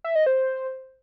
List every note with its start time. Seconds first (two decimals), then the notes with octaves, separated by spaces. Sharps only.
0.04 E5
0.15 D#5
0.26 C5